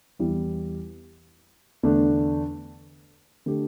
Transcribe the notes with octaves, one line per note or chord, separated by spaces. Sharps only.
E2 E3 G3 E4
E2 D3 A3 D4
D3 A3 G4